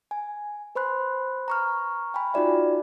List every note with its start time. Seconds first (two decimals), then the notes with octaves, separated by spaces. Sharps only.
0.11 G#5
0.75 B4 C5 B5 C6 F#6
1.48 A#5 C#6 F6
2.14 G5 G#5 B5
2.34 D#4 F4 F#4 D5 E5